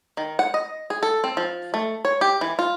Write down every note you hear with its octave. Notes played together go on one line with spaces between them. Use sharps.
D#3
F#5
D#5
G#4
A4
C4
F3
A3
C#5
G4
E3
F4